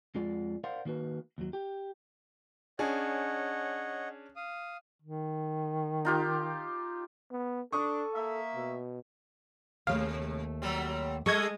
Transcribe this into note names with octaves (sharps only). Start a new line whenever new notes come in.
F2 G#3 F4 D5
A#4 C5 D5 F5 F#5 C6
D#3 A#3 F#4 B4
D#2 F#3
G4
C#4 D4 G#4 C#5 D#5 F#5
F5 D#6
D#3
D#4 F4 G4
B3
D4 A4 C#6 D#6
A#3 E5
B2
D#2 C3 A3 F5
F#3 G3 C4
G3 G#3 A4 D#5 C#6 G#6